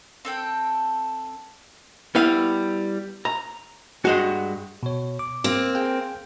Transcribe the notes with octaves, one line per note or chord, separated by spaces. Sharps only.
C4 A4 G5
G3 B3 E4 F5
A#5
G2 G#3 F#4
B2 C#5
D6
A#3 C4
G#4 F5 G5